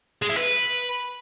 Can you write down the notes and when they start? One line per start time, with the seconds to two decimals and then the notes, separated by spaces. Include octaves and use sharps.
0.22 G#3
0.30 E4
0.37 B4